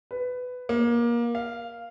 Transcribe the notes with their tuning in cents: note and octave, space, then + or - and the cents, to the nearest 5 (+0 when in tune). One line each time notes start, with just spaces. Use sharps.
B4 +15
A#3 +25
F5 -5